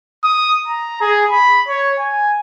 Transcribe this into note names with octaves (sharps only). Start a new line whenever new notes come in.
D#6
A#5
G#4
B5
C#5
G#5